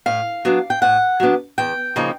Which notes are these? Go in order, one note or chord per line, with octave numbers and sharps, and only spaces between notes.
A2 F5
F#3 B3 D4
G5
A2 F#5
F#3 B3 D4
E2 G5
C#3 F3 A#3 D#4